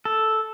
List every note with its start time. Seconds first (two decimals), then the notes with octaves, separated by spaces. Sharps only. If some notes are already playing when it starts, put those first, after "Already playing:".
0.05 A4